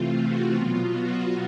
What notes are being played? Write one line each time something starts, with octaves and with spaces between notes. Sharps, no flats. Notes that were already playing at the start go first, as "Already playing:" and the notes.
Already playing: C3 E3 A3 C4 F4
F#4
B2 F#3 B3 F4
F#4